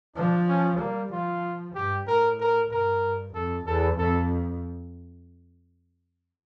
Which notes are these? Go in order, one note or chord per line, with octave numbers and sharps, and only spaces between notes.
F3 D4
C#4
G3 A#3
F3 F4
G2 G4
A2 A#4
A#4
G2 A#4
F2 A4
E2 A4
F2 A4